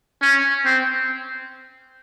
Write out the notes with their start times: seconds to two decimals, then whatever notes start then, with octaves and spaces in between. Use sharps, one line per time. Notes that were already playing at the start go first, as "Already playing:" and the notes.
0.22 C#4
0.65 C4